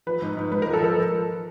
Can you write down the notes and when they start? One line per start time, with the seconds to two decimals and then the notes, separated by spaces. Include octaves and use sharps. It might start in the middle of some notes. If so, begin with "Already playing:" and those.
0.07 F3 B4
0.22 G#2
0.37 G#2
0.52 G#2 B4
0.62 F3 A#4
0.73 A4
0.82 F3 A#4